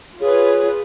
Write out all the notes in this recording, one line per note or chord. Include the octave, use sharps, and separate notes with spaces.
F4 G#4 B4 C#5